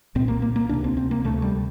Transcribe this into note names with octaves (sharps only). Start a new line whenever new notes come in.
C2 A#2 C4
A#3
A#3
A#3
D2 C3 D4
C4
C4
A#3
D2 C3 A3
G3